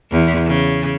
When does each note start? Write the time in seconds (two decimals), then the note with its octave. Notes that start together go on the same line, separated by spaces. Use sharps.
0.11 E2
0.46 C#3